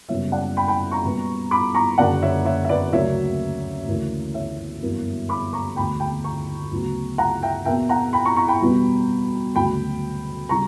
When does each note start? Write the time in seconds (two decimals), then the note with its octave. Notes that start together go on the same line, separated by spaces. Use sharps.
0.09 F#1 F#2 C#3 G3 B3 C#5 E5
0.32 D5 F#5
0.57 G5 B5
0.68 G5 B5
0.91 A#5 C#6
1.04 B1 A#2 G3 B3
1.51 B5 D6
1.75 A#5 C#6
1.98 F#1 F#2 D3 A#3 D5 F#5
2.22 C#5 E5
2.45 C#5 E5
2.64 E5
2.69 B4 D5
2.93 D2 C#3 F#3 A#3 C#5 E5
3.87 D2 C#3 E3 A#3
4.34 C#5 E5
4.82 G1 F#2 E3 A#3
5.29 B5 D6
5.53 A#5 C#6
5.76 E1 D2 D3 G5 B5
6.00 G5 B5
6.24 A#5 C#6
6.71 D2 C#3 F#3 B3
7.18 F#5 A#5
7.43 E5 G5
7.65 E2 B2 A#3 E5 G5
7.89 F#5 A#5
8.13 G5 B5
8.25 A#5 C#6
8.36 A#5 C#6
8.48 G5 B5
8.60 E2 B2 G3 B3
9.55 D2 C#3 F#3 G5 B5
10.49 C#3 G3 A#5 C#6